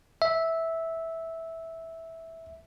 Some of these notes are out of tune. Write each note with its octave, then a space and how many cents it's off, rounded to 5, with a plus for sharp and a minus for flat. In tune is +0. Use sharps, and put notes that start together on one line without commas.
E5 -10